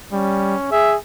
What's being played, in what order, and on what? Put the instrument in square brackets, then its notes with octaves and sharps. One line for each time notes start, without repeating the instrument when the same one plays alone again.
[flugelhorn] G3 [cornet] C#4
[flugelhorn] G#4 [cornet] E5